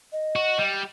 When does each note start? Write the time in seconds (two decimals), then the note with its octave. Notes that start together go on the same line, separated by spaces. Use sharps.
0.12 D#5
0.36 F#4
0.58 G3